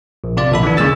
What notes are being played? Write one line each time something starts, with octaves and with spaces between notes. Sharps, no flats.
A#1
C3 F4 D5
A#1 D#2 A4 B5
D3 E3 D4
C#3 G#3 A#3 E6 A6